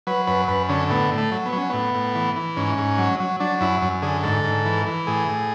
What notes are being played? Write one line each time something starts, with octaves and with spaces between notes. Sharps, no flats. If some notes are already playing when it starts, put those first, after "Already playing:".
F#3 B4
F#2 B4
F#2 B4
D3 C#4
A2 B3
A2
A3
F#3
B3
F#3 C#4
A2 B3
A2
E3
E3
G#2 C#4
G#2
F#3
F#3
F#3 D4
F#2 E4
F#2
D3 G#4
G#2 A4
G#2
E3
E3
A2 G#4
A2